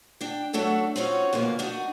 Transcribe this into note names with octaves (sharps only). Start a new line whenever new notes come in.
D4 G5
F#3 A3 D4 F#4 A4 E5
C4 C#4 D#4 F4 F#4 C#5
F2 B2 D3 A#3
D4 D#4 F#4